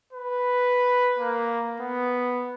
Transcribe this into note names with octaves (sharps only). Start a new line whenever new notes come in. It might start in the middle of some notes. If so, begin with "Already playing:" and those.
B4
A#3
B3